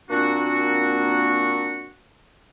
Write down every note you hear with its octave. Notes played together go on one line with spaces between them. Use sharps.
A#2 A#3 C4 D4 F#4